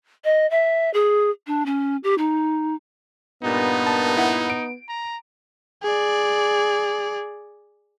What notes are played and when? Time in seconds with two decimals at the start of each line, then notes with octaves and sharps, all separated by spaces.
0.24 D#5
0.50 E5
0.94 G#4
1.47 D4
1.66 C#4
2.04 G4
2.18 D#4
3.43 G2 A#2 B3 D#4
3.87 A5
4.17 E4 F#5
4.50 D7
4.88 A#5
5.83 G#4 D5